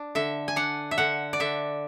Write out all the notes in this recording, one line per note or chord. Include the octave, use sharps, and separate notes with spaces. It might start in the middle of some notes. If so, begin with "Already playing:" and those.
Already playing: D4
D3 E5
G#5
D4 F#5
E5
D3 F#5
D5
D3 E5